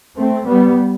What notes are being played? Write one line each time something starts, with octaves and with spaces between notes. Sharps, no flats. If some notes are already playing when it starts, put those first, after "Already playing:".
A3 C4
G3 B3